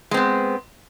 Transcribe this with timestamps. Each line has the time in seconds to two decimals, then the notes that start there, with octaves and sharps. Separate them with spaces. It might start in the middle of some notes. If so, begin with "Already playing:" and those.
0.11 G#3
0.14 C4
0.17 B3